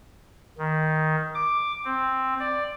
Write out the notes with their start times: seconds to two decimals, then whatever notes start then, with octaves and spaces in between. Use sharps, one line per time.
0.58 D#3
1.35 D6
1.84 C4
2.40 D5